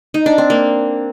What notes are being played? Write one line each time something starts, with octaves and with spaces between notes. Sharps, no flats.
D#4
D4
C4
A#3